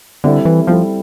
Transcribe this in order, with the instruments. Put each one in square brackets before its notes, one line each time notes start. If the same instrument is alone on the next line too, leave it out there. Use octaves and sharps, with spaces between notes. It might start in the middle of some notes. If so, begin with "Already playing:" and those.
[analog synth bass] D3 [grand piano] G3 C4 E4 A4
[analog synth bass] E3
[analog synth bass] F3 [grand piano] G3 C4 E4 A4